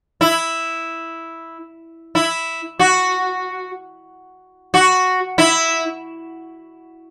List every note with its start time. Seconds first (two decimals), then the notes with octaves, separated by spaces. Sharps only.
0.21 E4
2.15 E4
2.79 F#4
4.74 F#4
5.38 E4